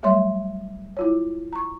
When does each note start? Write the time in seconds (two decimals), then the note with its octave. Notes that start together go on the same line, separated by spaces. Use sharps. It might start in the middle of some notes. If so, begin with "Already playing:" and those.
0.03 F#3 G3 A3 C#5 E5 C6
0.97 E4 F4 C#5
1.53 A#5 C#6